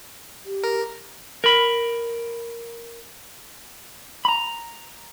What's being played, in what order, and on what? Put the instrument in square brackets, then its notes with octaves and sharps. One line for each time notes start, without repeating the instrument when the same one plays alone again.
[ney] G4
[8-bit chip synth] A#4
[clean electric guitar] A#4 B5
A#5 B5